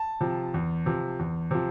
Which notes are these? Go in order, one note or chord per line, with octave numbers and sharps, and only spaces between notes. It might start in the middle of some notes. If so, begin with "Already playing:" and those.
Already playing: A5
C3 F3
E2
C3 F3
E2
C3 F3